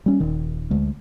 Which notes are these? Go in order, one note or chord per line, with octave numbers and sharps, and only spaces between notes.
G3 C#4
D#1 D#3
D2 G#3